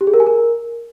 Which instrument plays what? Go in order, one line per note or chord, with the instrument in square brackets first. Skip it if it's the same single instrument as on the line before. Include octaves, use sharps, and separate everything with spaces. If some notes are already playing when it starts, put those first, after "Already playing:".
[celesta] G4
G#4
A#4
G#5
A#4